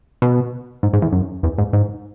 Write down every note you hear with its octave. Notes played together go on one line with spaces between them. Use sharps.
B2
G#2
G#2
E2
F#2
E2
G#2
G#2